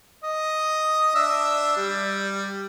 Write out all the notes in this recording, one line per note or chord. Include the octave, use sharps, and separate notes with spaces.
D#5
D4 E5
G3